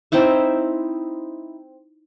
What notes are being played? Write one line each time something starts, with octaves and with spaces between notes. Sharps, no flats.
C4 D#4 E4 E5